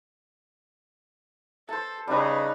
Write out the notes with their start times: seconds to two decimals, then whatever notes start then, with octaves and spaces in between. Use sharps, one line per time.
1.69 A4 C5 A5
2.08 C#3 G3 D#4 B4